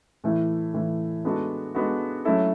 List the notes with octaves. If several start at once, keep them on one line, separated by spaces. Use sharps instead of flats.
A2 E3 A3
A2 E3 A3
G#3 B3 D4 F#4 A4
G#3 B3 D4 F#4 A4
F#3 A3 C#4 E4 A4